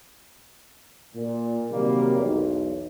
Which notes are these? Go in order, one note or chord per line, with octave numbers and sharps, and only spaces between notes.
A#2
C3 D#3 F#3 G3 A#3
B1 E2